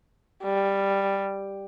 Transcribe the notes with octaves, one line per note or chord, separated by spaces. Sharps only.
G3